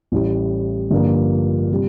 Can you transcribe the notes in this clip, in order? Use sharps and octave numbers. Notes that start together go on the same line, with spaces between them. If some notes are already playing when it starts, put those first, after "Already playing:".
A1 A2 G3
G2 D3 F3 A#3 F4
C3 G3